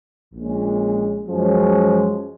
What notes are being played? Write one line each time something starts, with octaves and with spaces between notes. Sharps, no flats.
A#1 A#2 G#3 C#4
F#2 F3 G#3 C#4